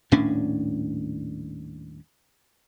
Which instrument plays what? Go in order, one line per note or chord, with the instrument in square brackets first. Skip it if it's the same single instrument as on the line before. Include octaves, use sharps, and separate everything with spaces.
[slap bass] D#1 A2 C#4 D4